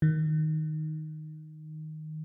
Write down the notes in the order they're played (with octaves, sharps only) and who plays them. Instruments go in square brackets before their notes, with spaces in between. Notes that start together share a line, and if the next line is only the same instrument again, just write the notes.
[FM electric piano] D#3